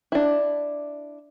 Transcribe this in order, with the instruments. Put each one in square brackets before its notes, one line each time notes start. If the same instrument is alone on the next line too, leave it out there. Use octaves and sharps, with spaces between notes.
[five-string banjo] D4 E4